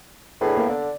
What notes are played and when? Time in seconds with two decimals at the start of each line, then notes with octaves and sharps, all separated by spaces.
0.41 A2 D4 G#4 B4
0.57 A#3 B3
0.69 D3 D5